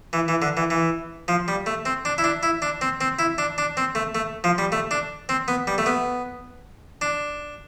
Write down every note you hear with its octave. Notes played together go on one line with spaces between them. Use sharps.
E3
E3
D3
E3
E3
F3
G3
A3
C4
D4
E4
D4
E4
D4
C4
C4
E4
D4
D4
C4
A3
A3
F3
G3
A3
D4
C4
B3
G3
A3
B3
D4